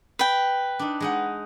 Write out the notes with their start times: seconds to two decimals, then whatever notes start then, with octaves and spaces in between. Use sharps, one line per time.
0.19 B4 G5
0.79 D4 D#4
1.00 G#3 D#4 F#5